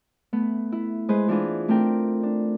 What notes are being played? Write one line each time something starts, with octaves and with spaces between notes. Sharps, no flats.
A3 B3
E4
G#3 G#4 B4 C5
E3 D4 F4 G#4 B4
A3 C4 D4 A#4 G5
D4